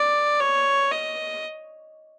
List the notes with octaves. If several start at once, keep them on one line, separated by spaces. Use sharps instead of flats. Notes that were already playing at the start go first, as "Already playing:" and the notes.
Already playing: D5
C#5
D#5